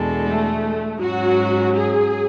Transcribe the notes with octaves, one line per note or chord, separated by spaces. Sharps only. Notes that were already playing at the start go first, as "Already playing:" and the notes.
Already playing: E2 B2 G#3 D4 A4
A3
G#2 F#3 C#4 F#4
G#4